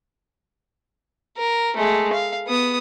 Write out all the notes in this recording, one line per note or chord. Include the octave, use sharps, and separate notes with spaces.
A#4
G#3 A3
F5
B3 D#6